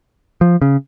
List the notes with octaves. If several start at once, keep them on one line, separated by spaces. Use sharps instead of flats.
F3
C#3